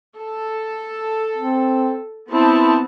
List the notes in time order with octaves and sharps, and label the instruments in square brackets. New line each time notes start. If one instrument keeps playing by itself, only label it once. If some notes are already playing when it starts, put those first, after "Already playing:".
[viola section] A4
[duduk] C4
[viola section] B3 C4 A5 [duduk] E4